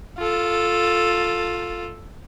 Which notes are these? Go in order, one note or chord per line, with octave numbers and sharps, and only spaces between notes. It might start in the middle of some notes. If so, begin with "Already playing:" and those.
F4 A4